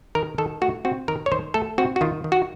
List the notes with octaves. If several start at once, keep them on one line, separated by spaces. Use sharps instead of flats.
D#3 A#4
D#3 A4
A3 F#4
C4 F#4
D#3 A#4
C#5
D#3 C5
A3 A4
C4 F#4
F#4
D#3 F4
D#3
F#4